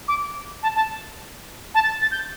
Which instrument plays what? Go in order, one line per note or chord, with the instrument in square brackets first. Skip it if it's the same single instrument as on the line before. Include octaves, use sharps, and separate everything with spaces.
[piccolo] D6
A5
A5
A5
A6
A6
G6